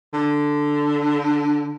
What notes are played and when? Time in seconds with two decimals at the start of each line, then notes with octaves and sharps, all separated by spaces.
0.13 D3